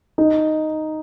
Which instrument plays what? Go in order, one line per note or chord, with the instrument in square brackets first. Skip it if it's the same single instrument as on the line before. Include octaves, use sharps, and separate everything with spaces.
[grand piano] D#4